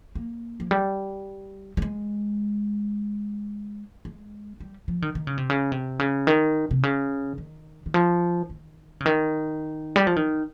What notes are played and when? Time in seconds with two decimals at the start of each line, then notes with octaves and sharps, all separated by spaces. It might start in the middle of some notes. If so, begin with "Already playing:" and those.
0.15 A#3
0.60 F3
0.71 G3
1.77 G3
1.82 G#3
4.05 G#3
4.60 G3
4.88 F3
5.02 D#3
5.15 D#3
5.27 C#3
5.38 C3
5.50 C#3
5.72 C3
5.99 C#3
6.27 D#3
6.71 C3
6.83 C#3
7.38 D#3
7.86 D#3
7.94 F3
8.50 D#3
9.00 C#3
9.06 D#3
9.96 G3
10.07 F3
10.16 D#3